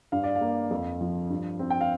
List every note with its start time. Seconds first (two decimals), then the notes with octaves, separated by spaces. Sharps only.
0.12 G2 F5
0.23 D5
0.35 F5
0.41 A#3
0.71 F2
1.01 F3
1.30 G2
1.59 C4
1.70 G5
1.81 F5